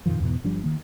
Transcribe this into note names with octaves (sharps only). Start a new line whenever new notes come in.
F2 A#2 D#3 F3
E2 G#2 B2 E3
G1 F3 G3 D4
D#3 A#3